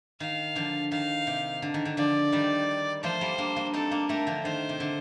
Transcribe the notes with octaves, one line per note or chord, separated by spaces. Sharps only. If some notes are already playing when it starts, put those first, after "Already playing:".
D#3 F5
D3 F3
D#3 F5
C3
D3
D#3
D3
D3 F3 D5
D#3 G3
F3 A3 C5
G3 A#3
A#3 D4
A#3 D4
C4 D#4 A4
A#3 D4
A3 C4 A#4
D3 F3
D#3 C5
C3
D3